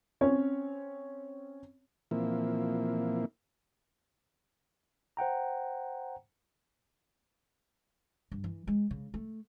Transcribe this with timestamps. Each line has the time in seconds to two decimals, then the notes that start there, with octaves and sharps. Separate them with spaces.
0.21 C4 C#4 C#5
2.11 A#2 E3 F3 A#3 C4 E4
5.17 C5 F#5 G5 A#5
8.32 G2
8.44 E3
8.67 G#3
8.91 C#3
9.14 A3